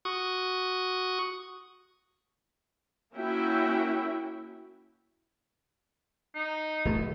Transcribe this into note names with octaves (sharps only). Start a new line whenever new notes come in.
F#4 C#6 D#6
A#3 C#4 E4 F#4 E5 G5
D#4
D1 A3